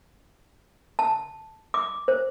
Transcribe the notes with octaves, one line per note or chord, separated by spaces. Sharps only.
A5
D6
C5